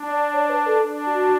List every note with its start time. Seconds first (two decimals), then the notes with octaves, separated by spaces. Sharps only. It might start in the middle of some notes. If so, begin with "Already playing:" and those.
Already playing: D4
0.10 D5
0.34 C#5
0.49 B4
0.66 A4
0.82 D4
1.06 F#4